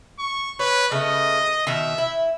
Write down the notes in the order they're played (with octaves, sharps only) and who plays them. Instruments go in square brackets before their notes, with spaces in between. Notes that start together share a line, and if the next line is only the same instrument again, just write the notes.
[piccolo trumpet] C#6
[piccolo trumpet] B4 [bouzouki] C#5
[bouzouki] C#3 A3 B3 [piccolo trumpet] D#5
[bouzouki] B2 D#3 [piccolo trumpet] E5
[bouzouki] E4